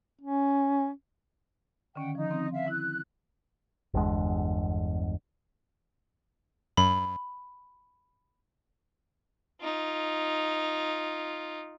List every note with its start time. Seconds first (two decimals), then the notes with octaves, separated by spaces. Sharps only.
0.21 C#4
1.95 D3 D#3 C#4 F#5 G5
2.15 F3 D#4
2.31 C4
2.54 E5 F5
2.68 E4 F#6
3.94 G1 E2 D3 G#3
6.77 F#2 B5
9.61 D#4 F4